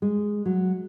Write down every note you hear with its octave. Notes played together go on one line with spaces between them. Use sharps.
G#3
F#3